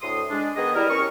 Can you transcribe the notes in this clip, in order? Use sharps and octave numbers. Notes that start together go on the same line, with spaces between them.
D2 A2 C6 D#6
G#3 D4
D#3 B3 G#4 D#5
G3 E4 A#4
C#4 A#4 C#6